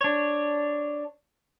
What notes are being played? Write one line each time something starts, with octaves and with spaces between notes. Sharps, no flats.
D4 C#5